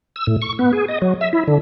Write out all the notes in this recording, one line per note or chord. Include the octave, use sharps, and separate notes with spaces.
E6
A2
C#6
B3
G#4
D#5
F#3
E5
E4
D3